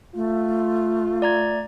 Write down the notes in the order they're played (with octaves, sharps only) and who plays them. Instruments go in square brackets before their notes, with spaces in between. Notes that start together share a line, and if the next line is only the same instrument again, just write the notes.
[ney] A3 [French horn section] F4
[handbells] D5 A#5 G#6